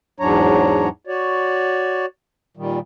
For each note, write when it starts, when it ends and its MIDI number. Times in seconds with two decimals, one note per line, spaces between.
0.20 0.89 40
0.20 0.89 44
0.20 0.89 54
0.20 0.89 62
0.20 0.89 73
0.20 0.89 82
1.07 2.06 66
1.07 2.06 73
1.07 2.06 74
2.57 2.79 46
2.57 2.79 51
2.57 2.79 55